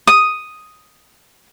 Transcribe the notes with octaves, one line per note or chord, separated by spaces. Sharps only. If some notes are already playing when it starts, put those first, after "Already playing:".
D#6